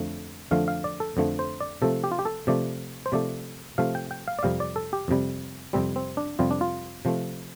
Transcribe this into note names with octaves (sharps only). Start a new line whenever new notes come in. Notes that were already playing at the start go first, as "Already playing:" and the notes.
Already playing: F2 D3 F3 A3
F2 D3 F3 A3 F5
F5
D5
A4
F2 D3 F3 A3
C5
D5
C3 F3 A3 A4
G4
F4
G4
A4
C3 F3 A3 D5
C5
C3 F3 A3 D5
C3 F3 A3 F5
G5
G5
F5
D5
F2 C3 G3 F5
D5
A4
G4
F2 C3 G3
F2 C3 G3 C4
C4
D4
F2 C3 G3 F4
D4
F4
C3 F3 A3